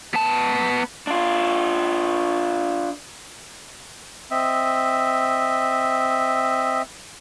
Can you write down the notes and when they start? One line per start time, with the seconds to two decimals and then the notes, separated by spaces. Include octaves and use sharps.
0.14 B3 A5
1.07 D4 F4
4.31 C4 D#5 E5